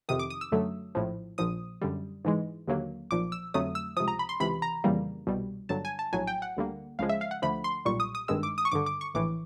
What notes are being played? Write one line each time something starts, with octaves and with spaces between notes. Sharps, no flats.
F2 C3 D#3 D#6
D6
D#6
E6
F#2 D3 F#3 A3
A#1 A2 F3
A#1 A#2 F3 D#6
F#2 D3 G3
G#2 E3 G#3
D#2 D3 F#3 A#3
B1 A#2 F3 D6
E6
F2 D3 F#3 A3 D#6
E6
C#2 C3 F3 D#6
A#5
B5
C6
C#2 C3 E3 B5
A#5
F2 C#3 E3 G3 A#3
C2 B2 G3
G1 G2 D3 F#3 A5
G#5
A5
A#1 A2 F#3 G#5
G5
F#5
D2 D3 G3 A#3
C#2 C#3 F3 G#3 F5
E5
F5
F#5
D2 D3 F3 A3 B5
C6
B1 A#2 G3 C#6
D#6
D#6
G#1 G2 D#3 G#3 E6
D6
D#6
C#6
G#1 G2 D3 D6
D6
C#6
A#1 A2 E3 D6